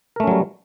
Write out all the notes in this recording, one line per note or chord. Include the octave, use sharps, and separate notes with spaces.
F#3 G3 A3 C#4 A#4